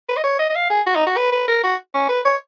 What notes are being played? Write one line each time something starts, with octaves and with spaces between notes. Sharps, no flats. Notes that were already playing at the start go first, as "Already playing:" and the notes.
B4
D#5
C#5
D#5
D#5
F5
G#4
F#4
D#4
F#4
B4
B4
A#4
F#4
C#4
B4
C#5